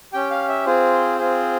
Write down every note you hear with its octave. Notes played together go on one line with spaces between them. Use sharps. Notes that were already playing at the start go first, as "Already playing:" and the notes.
C#4 G4 G5
F5
E5
C4 F4 G#4 C5
C4 F4 G#4